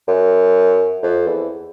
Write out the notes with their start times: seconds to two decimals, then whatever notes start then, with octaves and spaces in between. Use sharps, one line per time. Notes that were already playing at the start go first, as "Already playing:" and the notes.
0.08 F#2
1.03 F2
1.27 E2